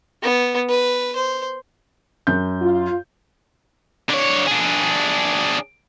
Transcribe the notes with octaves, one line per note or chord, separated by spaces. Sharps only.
B3
B4
C5
F#2 G6
F4
D3 C#5
D4 G#4